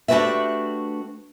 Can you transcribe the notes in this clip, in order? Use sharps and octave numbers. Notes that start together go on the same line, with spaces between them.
A3 D4 F#4 G4 B4 E5